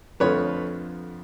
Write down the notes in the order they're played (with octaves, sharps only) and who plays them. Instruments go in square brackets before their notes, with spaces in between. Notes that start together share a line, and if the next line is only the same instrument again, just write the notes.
[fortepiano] F2 D3 F3 A3 B4 C#5